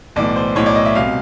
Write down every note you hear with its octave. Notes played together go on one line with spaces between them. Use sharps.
B1 A2 E3 D5
C5
B1 A2 E3 C#5
D5
D#5
E5
C2 B2 F5